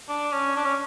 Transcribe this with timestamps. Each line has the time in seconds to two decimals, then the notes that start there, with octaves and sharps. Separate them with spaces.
0.08 D4
0.32 C#4
0.56 D4
0.65 C#4